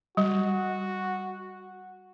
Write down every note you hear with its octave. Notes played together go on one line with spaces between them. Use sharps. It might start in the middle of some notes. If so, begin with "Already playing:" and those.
G3 F#4